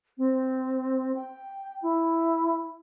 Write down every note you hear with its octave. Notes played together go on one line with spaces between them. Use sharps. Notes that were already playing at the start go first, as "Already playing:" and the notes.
C4
G5
E4